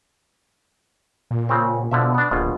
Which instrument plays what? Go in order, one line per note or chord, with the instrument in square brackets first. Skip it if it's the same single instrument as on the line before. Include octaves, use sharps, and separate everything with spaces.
[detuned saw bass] A#2
[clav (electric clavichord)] C#3 C4
[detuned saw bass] B2 [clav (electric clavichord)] D3 F3 E5
[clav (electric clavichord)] B3 D4
[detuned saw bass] D1 [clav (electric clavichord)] A#1 B2 F4